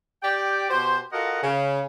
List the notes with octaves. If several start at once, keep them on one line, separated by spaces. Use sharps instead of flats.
G4 D5 G5
B2 F#4 G4 C5
F4 F#4 A4 A#4 D#5 F#5
C#3